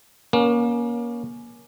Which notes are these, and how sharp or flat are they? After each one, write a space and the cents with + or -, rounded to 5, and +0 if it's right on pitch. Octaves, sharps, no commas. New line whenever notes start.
A#3 +30 C#4 +20